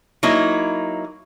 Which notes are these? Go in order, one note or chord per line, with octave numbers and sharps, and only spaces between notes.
F#3 A#3 D#4 E4